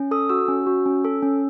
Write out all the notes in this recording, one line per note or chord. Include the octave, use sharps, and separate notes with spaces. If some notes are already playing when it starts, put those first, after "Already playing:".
Already playing: C#4
A4 D#6
F#4 E6
C#4
F#4
C#4
A4
C#4